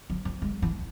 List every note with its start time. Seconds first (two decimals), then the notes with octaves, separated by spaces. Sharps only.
0.10 F3
0.25 F3
0.42 G#3
0.62 E3